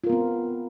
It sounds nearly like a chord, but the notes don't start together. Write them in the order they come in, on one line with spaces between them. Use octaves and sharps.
F4 A#4 B3 C4